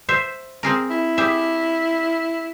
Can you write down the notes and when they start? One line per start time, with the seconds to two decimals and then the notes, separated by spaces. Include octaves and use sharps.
0.09 C5 E5
0.63 C4 G#4 A#4
0.90 E4
1.18 G4 G#4 E5